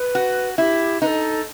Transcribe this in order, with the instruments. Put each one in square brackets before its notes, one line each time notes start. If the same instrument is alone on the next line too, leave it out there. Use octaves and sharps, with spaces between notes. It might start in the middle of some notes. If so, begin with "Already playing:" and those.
Already playing: [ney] B4
[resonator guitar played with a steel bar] F#4
[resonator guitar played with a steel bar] E4 [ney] G4
[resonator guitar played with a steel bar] D#4 [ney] B4
[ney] A4